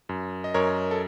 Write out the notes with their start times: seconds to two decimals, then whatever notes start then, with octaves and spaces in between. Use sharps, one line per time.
0.09 F#2
0.44 D#5
0.54 F#2 A#4 C#5
0.91 A4